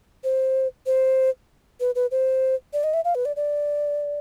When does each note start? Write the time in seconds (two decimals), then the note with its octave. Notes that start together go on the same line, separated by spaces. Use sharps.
0.24 C5
0.86 C5
1.80 B4
1.95 B4
2.11 C5
2.73 D5
2.84 D#5
2.94 E5
3.05 F5
3.15 B4
3.25 D5
3.36 D5